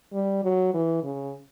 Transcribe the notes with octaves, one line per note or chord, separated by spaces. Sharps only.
G3
F#3
E3
C#3